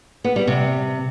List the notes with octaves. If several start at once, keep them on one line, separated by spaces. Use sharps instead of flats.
B3
G3
C3